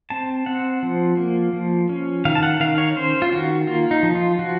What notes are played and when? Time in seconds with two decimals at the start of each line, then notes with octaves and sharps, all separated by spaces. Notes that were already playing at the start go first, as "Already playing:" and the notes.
0.10 C4 A5
0.46 C4 F#5
0.83 F3
1.17 A#3
1.53 F3
1.89 C#4
2.25 D#3 F5
2.35 A5
2.43 F#5
2.60 D#3 F5
2.78 C#5
2.96 C#4 C5
3.22 F4
3.32 D#3 F#4
3.67 A#3 F4
3.91 D#4
4.03 F3
4.15 F4
4.39 F3 F#4